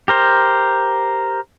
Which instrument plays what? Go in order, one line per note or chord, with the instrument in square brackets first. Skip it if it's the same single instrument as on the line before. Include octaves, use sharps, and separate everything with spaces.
[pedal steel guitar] G4 A#4 C5